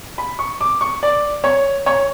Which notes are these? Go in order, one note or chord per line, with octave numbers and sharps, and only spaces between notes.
B5
C#6
D6
C#6
D5
C#5
C#5